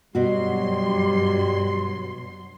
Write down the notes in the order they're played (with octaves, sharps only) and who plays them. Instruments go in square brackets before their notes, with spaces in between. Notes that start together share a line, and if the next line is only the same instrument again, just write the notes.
[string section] G2 F#3 C6 [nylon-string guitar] B2 F#4 [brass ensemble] G3